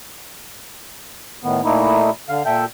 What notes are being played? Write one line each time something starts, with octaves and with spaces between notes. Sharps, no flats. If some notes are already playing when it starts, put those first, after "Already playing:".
A2 D#3 B3
A#2 A3 A#3 D#4 E4
D3 F5
A#2 A4 E5 G5 G6